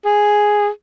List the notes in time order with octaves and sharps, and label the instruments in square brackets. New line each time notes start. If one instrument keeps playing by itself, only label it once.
[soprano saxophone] G#4